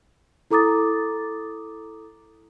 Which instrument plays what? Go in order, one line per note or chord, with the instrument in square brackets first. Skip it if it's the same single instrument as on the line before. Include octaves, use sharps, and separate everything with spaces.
[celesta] E4 A4 A#5 D6 D#6 A6